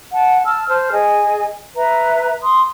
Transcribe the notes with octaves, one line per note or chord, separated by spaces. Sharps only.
F#5 A5
A5 E6 F6
C5 A5 F6
G#4 D#5 G#5
B4 E5 A#5
C6 D#6